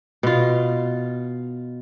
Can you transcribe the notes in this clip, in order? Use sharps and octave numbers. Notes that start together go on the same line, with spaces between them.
B2 F4